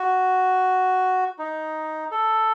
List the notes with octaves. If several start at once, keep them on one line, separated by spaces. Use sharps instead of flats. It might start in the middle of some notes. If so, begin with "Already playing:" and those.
Already playing: F#4
D#4
A4